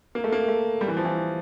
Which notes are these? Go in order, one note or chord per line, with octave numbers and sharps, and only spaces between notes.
A#3
A3
A#3
A3
G3
E3
F3
E3